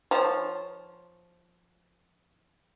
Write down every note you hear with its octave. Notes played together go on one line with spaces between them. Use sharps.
F3 C#5